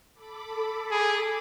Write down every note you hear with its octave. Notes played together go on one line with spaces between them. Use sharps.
A4 B5 D6
G#4